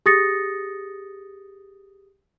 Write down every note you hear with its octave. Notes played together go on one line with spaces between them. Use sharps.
G4 G#4 D#6 A6 A#6 C#7